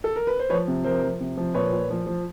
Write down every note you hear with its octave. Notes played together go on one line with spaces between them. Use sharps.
A4
A#4
B4
C5
F3 B4 C#5
C3
F3 A#4 C5
F3
C3
F3
A#2 B4 C#5
A#2
F3
F3